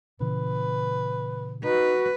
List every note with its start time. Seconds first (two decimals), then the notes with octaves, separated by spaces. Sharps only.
0.20 A#2 C#3 E3 B4
1.64 D#4 F#4 B4